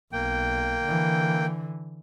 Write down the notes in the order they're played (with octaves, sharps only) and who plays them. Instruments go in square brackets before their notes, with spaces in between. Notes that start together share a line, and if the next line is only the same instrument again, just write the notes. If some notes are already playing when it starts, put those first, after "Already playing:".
[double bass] B1 [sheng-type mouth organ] A#3 G5
[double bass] D3 E3